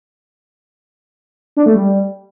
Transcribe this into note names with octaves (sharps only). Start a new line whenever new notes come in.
D4
A3
G3